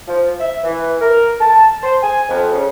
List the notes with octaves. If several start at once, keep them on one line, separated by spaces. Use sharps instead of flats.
F3
E5
E3
A#4
A5
C5
G#5
F2
C#3